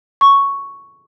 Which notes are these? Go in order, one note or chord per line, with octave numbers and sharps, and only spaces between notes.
C#6